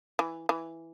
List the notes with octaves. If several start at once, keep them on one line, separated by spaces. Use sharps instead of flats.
E3
E3